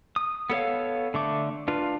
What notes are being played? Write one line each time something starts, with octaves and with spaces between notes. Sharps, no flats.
D#6
B3 A4 C#5 F5
D3 A3 D6
D4 F4 B4